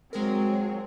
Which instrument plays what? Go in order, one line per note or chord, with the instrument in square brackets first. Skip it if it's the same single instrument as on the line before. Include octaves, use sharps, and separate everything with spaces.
[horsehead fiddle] F#3 C4 [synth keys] G#3 G#4 A#4